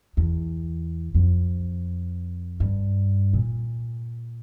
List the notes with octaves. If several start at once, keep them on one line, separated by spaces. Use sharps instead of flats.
E2
F2
G2
A#2